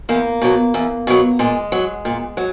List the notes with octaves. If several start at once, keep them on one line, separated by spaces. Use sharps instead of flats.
E2 A#3
B2 F#3
E2
B2 F#3
A#2 G#3
F#3
A#2
F#3